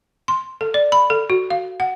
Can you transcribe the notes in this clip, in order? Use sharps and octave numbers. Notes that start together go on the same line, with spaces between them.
C6
A4
D5
B5
A4
F#4
F5
F#5